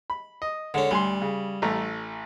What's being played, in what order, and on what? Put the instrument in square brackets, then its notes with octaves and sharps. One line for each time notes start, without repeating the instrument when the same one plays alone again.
[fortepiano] B5
D#5
[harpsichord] D3 C#4 [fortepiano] G#3
[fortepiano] D2 G#5 C6 [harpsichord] G3
[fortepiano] C#3
A1 A3 A#5